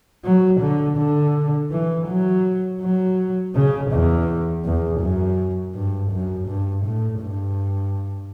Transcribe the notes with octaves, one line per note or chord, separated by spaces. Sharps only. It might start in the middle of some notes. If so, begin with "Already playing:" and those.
F#3
D3
D3
E3
F#3
F#3
C#3
E2
E2
F#2
G2
F#2
G2
A2
G2